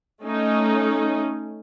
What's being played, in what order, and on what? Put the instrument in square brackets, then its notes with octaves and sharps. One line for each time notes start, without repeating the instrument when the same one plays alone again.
[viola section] A3 C#4 D#4